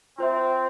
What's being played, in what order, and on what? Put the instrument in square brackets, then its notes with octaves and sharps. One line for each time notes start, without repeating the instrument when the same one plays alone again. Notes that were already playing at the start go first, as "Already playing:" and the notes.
[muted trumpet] C4 [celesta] F4 C5 E5